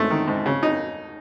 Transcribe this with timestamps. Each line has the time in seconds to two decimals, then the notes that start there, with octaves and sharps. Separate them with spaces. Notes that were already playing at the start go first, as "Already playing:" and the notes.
Already playing: G#2 A3
0.11 D#3
0.28 G#2
0.46 C#3
0.63 D#4